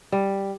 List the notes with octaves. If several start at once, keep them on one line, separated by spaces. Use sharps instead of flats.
G3